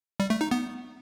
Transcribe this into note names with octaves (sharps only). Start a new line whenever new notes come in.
G3
A3
D#4
B3